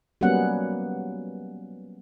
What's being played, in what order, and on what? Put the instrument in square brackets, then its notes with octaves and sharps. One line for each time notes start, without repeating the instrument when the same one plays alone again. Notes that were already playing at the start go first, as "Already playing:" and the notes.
[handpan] F#3 G3 A#3 B3 C#4 F#5